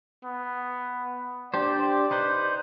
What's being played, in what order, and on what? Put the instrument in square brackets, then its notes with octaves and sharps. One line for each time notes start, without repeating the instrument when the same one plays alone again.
[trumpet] B3
[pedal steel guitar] D4 G4 C5 [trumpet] D5
[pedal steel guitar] D#4 B4 C5